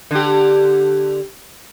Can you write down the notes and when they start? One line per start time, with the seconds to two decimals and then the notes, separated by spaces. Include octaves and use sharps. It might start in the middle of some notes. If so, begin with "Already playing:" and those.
0.11 D3 G4